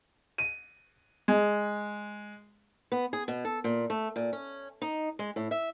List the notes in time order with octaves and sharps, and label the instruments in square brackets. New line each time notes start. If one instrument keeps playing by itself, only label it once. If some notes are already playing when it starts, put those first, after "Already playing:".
[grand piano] D#7
G#3
[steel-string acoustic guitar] B3
G#4
B2
A4
A#2
A3
A#2
C#4
D#4
G#3
A2
E5